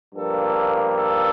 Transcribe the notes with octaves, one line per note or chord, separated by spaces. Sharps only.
G2 F3 A#3 A4
A4